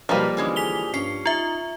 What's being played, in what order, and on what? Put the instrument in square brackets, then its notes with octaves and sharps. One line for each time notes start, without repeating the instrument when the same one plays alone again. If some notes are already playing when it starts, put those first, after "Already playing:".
[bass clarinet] B2 [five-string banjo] F3 G3 A#3 [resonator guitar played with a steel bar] D#4 B4
[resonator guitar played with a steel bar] D3 E3 G#3 [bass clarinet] C#4
[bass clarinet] G#4 [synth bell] B6 F7 G7
[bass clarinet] G2 [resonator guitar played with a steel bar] C#4 [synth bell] C7
[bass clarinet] D#4 [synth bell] F4 E5